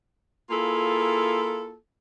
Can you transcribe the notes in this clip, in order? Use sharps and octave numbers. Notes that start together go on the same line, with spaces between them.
A#3 E4 F4 G#4 A4